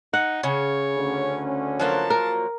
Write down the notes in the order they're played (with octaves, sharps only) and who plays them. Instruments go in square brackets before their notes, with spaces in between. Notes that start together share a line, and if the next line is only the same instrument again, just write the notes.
[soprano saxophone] D#4 [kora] F#5
[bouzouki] C#3 [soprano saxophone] C#5
[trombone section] D2 D3 C#4
[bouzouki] F3 F#3 A#3 [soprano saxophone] A5
[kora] A#4